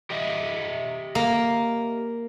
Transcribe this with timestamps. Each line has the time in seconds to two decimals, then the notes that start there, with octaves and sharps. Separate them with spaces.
0.10 G4 D#5 E5
1.15 A#3